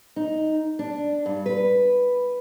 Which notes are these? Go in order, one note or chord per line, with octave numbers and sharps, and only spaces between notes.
D#4
D4
G2
B4